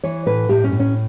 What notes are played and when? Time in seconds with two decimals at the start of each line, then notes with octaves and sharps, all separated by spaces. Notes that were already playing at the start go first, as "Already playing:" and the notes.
0.04 E3 C#5
0.26 A2 B4
0.49 A2 G4
0.64 C#4
0.72 A2
0.80 C#4